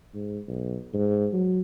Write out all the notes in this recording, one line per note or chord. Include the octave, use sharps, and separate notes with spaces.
G#2
B1
G#2
F#3